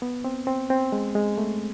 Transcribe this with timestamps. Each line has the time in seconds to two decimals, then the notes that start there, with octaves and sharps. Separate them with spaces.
0.02 B3
0.24 C4
0.47 C4
0.70 C4
0.92 G#3
1.15 G#3
1.38 A3